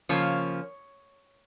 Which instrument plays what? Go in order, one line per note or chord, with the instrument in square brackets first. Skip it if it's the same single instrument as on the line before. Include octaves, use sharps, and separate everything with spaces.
[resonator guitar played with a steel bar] C#3 F3 A#3 C#4 C#5